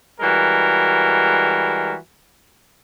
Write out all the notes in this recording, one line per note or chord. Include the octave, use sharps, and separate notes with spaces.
E3 G3 G#3 F#4 A#4